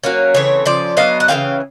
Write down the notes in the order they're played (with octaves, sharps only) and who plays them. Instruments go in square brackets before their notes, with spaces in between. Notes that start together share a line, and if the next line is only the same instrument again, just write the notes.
[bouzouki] F#3 A#3 C#4
C#3 E3 A3 C4 C#5
C#3 F3 D5
F#3 B3 D4 D#5 F5
F#5
C#3 E3 G#3 C#4 F5 G5